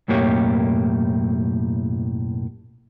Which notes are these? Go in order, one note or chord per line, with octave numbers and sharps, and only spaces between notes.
B1 F#2 A2 A#3 G4 C#5